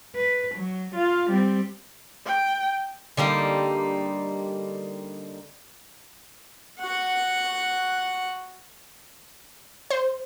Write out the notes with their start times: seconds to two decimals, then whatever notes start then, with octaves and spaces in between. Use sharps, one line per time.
0.15 B4
0.55 F#3
0.96 F4 F5
1.30 G3 C4
2.27 G5
3.17 D3 G3 A#3 D#4
6.79 F#4 F#5
9.90 C5